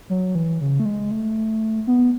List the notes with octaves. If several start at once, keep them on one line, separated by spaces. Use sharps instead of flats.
F#3
E3
C#3
A3
G#3
A3
B3